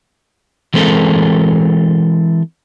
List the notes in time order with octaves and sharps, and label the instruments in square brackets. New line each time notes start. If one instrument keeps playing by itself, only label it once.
[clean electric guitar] E3 G#3 C4 A4 A#4